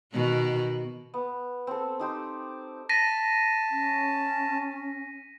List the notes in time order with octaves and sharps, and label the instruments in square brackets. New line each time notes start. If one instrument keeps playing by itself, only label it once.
[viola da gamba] B2 D#3 F#4
[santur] B3
C4 A4
D#4 G4 C5
[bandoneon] A5 [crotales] A#6 B6 D#7
[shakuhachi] C#4